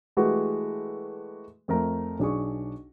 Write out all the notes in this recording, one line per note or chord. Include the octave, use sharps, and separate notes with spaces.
E3 G#3 A3 F#4 G4 B4
F2 A3 A#4 A#5
B1 D4 G#4 C#6